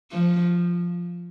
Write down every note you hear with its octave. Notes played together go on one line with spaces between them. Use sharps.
F3